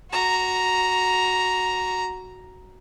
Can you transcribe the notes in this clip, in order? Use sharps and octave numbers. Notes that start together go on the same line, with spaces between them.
F#4 A#5